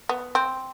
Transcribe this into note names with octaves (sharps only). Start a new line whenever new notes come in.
B3
C4